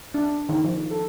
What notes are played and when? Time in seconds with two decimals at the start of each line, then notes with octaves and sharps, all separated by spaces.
0.14 D4
0.49 D#3
0.64 F3
0.91 A4